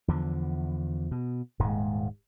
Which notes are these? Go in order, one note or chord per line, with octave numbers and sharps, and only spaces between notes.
E2 D3 F3
B2
D#1 G#2 G#3